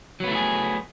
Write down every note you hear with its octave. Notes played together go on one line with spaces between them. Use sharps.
F#3 A3 B3 E4 G#4